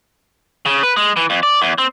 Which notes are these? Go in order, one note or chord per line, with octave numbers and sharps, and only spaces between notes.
C#3
B4
G#3
E3
F2
D5
E2
C4